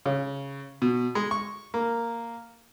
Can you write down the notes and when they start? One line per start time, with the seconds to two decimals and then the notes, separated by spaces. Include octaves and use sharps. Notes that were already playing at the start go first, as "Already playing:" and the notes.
0.06 C#3
0.82 B2
1.15 G#3
1.31 C#6
1.74 A#3